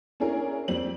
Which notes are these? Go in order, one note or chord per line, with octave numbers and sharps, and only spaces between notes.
C#4 D4 E4 G#4 A#4 C#5
F2 G3 C4 F#7